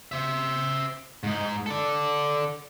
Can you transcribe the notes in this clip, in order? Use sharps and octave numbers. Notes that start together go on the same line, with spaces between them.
C5 E5
G#2 D#4
A4 D5